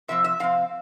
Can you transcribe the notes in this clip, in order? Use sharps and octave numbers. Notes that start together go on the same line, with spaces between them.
C3 F3 C4 E5
E5
C3 F3 C4 F5